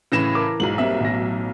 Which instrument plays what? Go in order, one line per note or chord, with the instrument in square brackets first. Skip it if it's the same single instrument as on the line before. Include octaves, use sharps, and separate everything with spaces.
[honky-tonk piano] A2 C#3 [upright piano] E3 A#6 E7
[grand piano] A#4 A5 D6
[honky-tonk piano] B1 F#3 F#7 [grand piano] G#2
[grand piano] G3 A#3 C4 [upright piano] E5
[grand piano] A1 B2 A#6